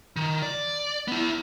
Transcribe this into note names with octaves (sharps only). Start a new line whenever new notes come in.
D#3
D5
B3 E4